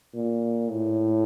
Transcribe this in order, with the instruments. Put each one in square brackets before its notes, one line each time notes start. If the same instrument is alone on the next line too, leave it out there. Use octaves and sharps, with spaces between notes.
[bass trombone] A#2
A2